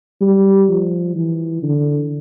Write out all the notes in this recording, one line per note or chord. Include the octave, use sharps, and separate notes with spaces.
G3
F3
E3
D3